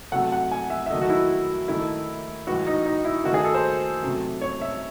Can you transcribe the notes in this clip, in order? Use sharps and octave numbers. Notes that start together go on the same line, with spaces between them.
C3 F#3 A3 F#5
F#5
G#5
E5
E5
D#3 F#3 A3 D#5
F#4
E4
D#3 A3 E4
A2 E3 G#3 F#4
D#4
D#4
E4
D#3 A3 F#4
G#4
A4
C5
C3 F#3 A3
C#5
E5